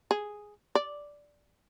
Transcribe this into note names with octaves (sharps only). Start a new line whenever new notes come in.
G#4
D5